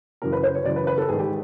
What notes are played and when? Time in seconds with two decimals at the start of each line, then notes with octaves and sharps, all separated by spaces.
0.22 F#2 C#3 E3 A#4
0.32 B4
0.43 C5
0.55 C#5
0.65 F#2 C#3 E3 D5
0.76 B4
0.87 B4
0.98 A4
1.09 G#2 D#3 G#4
1.19 G4